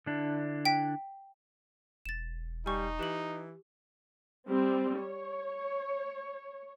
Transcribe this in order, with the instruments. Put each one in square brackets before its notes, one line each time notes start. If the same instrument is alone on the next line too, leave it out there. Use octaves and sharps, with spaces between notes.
[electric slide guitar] D3 D4 E4
[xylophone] G5 B6
[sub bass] E1 [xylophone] A6 E7
[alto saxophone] G3 [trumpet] D#4 [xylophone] G#5 C#6
[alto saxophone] E3 [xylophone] G4 F#7
[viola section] G3 C4
C#5